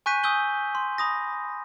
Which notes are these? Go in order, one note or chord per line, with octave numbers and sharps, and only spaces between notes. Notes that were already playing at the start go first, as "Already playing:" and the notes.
G#5 C#6 F#6 G6 B6 D#7
G#5 D#6 E6 G6 G7
C6
B5 D#6 A#6